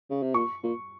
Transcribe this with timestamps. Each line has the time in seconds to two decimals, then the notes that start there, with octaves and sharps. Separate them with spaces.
0.10 C#3
0.22 C3
0.34 A#2 C#6
0.64 A#2